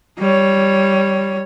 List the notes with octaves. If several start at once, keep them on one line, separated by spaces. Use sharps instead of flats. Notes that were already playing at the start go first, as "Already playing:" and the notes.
G3 C#5